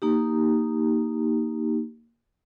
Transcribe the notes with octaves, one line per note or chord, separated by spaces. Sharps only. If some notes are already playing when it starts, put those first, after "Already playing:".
A#3 D#4 G4